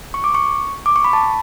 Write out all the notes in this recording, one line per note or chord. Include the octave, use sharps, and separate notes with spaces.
C#6
D6
C#6
D6
C#6
B5
A5